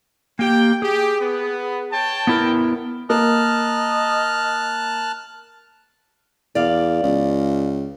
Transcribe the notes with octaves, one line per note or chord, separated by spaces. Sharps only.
A#3 G4 G5
G4 G#4
B3
C#5 G5 A5
B3 E4 A#4
A#3 D#5 A5 F6 F#6
E2 D5 F5
C#2